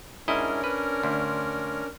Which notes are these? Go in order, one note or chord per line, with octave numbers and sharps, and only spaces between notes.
G#2 C#4 D4 E4 A#4 D#5
B4
D2